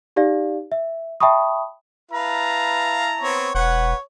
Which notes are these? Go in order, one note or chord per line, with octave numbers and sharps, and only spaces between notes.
D#4 G4 D5 F5
E5
E5 G5 A5 B5 C#6 D#6
E4 B4 F5 A5 A#5
B3 C4 C#5
E1 B4 C#5 F#5